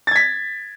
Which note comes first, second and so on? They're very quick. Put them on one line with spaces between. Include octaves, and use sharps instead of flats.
A6 G#6 B6